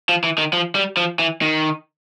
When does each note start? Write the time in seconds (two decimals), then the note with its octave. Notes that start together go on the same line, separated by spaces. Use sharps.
0.09 F3
0.24 E3
0.38 D#3
0.53 F3
0.75 G3
0.97 F3
1.19 E3
1.41 D#3